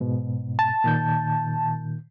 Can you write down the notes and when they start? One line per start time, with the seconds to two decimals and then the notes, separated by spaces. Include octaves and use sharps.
0.01 G#2 B2
0.59 A5
0.84 A#2 D#3 G6